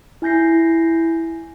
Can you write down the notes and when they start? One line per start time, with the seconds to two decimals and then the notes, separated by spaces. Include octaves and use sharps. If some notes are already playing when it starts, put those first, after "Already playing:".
0.22 E4 G#5 G6 A#6 C7